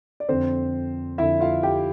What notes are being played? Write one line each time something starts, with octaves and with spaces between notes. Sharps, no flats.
D5
F2 D3 C4 C5
F2 D3 E4 E5
F4 F5
G4 G5